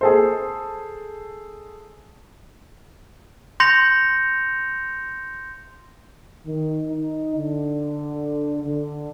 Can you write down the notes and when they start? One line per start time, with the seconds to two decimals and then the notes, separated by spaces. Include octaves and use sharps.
0.01 G#4 A4 C5
3.60 C6 G6 A#6 C#7 F7
6.46 D#3
6.88 D#4
7.36 D3
8.63 D3